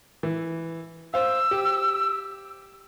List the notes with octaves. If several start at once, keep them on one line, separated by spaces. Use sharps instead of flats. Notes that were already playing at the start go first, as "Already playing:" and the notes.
E3
C5 F5 E6
G4